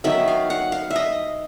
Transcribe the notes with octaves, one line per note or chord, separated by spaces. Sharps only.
D#3 F#3 B3 E5
F5
F#5
F5
E5
D#5